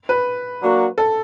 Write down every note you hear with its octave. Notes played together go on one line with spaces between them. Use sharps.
B4
F#3 A#3 D4 F#4
A4